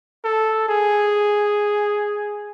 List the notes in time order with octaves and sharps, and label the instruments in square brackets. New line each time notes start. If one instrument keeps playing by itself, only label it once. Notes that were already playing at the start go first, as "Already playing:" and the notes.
[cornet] A4
G#4